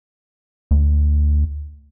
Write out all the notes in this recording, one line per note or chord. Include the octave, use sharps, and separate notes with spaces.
D2